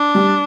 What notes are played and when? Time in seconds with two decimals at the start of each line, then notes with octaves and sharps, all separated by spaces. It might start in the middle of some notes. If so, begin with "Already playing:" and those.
Already playing: D4
0.15 G3